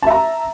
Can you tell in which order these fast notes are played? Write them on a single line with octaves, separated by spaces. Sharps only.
A5 E5 A#5